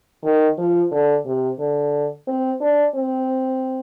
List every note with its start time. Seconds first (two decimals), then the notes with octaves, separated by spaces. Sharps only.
0.24 D#3
0.58 F3
0.91 D3
1.26 C3
1.59 D3
2.27 C4
2.61 D4
2.95 C4